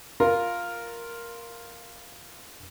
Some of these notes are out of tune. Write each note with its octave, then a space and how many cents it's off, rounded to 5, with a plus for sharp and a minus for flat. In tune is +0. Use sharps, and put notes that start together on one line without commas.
F4 +0 A#4 +0